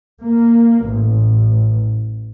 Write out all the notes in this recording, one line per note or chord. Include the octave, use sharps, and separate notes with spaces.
A#3
A1